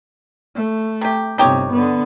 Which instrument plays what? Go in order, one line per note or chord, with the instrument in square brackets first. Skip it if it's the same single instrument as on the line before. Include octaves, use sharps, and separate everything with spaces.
[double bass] A3
[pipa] C3 G4
[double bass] G1 C3 [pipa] D#4 G4 C#5
[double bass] D3 B3